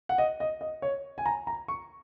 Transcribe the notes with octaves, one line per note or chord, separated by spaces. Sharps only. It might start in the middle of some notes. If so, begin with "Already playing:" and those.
F#5
D#5
D#5
D#5
C#5
G#5
A#5
A#5
C#6